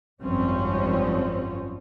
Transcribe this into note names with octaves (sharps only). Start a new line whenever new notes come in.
G#1 F#2 F3 G3 C4 C#4